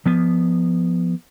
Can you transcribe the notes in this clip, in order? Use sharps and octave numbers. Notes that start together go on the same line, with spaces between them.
F3 B3